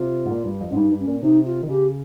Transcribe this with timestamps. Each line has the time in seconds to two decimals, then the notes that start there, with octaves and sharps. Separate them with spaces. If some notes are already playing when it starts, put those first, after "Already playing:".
Already playing: C3 F4
0.26 G#2
0.30 A#2
0.45 G2
0.61 F2
0.70 G#2 C#4
0.76 G2 D#4
0.92 G2
1.00 C#4
1.07 A#2
1.23 C3 D#4
1.45 F4
1.63 D#3
1.69 C#3 G4